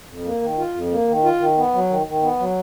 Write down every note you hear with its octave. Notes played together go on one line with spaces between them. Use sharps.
F2
A#3
D#3
F4
F2
A#3
D#3
F4
D#3
B3
F#3
D#3
D#3
B3
F#3